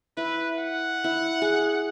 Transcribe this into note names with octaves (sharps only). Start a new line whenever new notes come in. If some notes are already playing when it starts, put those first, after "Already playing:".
E4 B4
F#5
E4
G#4